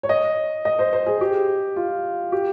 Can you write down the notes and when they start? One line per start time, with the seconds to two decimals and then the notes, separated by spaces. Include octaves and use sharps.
0.03 C#5
0.09 D#5
0.65 D#5
0.79 C5
0.93 C5
1.06 G#4
1.21 G4
1.76 F4
2.32 G4